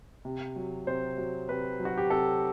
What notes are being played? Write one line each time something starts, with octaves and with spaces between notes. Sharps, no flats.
C3
F#3
C3 C5
F#3
C3 B4
F#3
F#4
G4
C3 A4